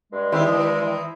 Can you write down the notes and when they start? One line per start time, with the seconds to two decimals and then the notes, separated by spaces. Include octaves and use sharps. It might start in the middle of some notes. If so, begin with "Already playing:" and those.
0.13 G2 G#3
0.32 D#3 E4 G4 G#4 C5 E5
0.47 D#3 E3